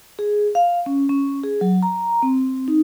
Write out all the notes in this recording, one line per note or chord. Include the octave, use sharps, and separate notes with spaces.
G#4
F5
C#4
C#4
G#4
F#3
A#5
C4
D#4